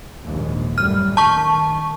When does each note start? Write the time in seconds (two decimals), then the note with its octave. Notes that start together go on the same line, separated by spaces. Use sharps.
0.23 A#1 D#2 G#2
0.78 F#2 A2 G3 F6
1.17 D#3 A5 C#6